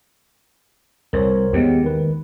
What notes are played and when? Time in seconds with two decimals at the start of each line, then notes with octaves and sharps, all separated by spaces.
1.13 C2 A#4 C5 C#5
1.53 D#2 G#3 B3 G4
1.84 D#3 B4